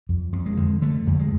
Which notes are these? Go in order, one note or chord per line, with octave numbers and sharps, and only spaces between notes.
F2
F2
G#3
D3
D3 A3
F2
G#3